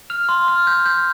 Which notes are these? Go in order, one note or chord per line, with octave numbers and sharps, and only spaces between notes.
F6 F7
C6
F6
G6
G6